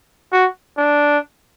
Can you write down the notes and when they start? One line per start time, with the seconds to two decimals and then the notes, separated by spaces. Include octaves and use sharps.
0.32 F#4
0.78 D4